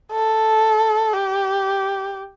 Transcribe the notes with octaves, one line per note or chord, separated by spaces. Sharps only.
A4
G4